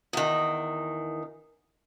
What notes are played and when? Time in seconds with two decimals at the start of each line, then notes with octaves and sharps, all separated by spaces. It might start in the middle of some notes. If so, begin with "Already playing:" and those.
0.13 E2 D#3